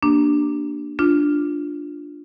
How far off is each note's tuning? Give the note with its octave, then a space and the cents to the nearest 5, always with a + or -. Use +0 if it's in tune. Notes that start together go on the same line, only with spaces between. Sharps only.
A#3 +0 D4 +0 G4 -20
D4 +0 F4 +0